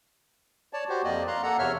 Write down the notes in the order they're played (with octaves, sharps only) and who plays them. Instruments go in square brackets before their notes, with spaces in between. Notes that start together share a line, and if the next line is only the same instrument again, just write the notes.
[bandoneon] C#5 D5 A5
F#4 G4 C5
F2 A#3 D5 D#5
F5 A#5 C6 F#6
A#3 A4 F#5 A#5
E2 C3 C#5 E5 F6